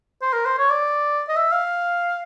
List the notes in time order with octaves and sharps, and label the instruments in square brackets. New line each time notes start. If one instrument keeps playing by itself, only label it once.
[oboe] C5
A#4
C5
C#5
D5
D#5
E5
F5